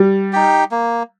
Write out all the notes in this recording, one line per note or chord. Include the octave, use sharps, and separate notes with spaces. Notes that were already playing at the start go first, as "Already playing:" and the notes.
Already playing: G3
D#4 G4
A#3